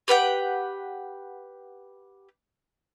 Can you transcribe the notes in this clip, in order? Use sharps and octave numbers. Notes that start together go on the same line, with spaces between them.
G4 B4 F#5 G5